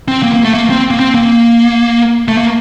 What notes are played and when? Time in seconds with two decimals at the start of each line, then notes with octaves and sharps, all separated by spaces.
0.08 C4
0.23 A#3
0.34 A#3
0.44 A3
0.54 A#3
0.70 C4
0.91 A#3
1.00 C4
1.15 A#3
2.28 A3
2.38 A#3